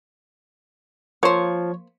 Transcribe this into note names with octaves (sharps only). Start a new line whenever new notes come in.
F3 A#3 C5 C#5